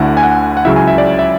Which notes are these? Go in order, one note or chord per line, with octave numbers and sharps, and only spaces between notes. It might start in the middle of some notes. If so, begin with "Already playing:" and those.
Already playing: D2 D3 A3 E4 F#5
G#5
F#5
F#5
C#2 C#3 F#3 C#4 E4 E5
G#5
E5
D5
E5